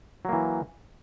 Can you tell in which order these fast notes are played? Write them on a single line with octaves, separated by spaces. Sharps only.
F#3 A#3 E3